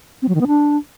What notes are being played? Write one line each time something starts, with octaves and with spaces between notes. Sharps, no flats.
C4
F#3
D#3
B3
D4